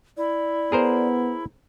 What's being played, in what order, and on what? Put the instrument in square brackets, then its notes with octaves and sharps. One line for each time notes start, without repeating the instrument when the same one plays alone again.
[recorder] E4 [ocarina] D5
[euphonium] B3 [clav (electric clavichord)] G#4 A#4 C5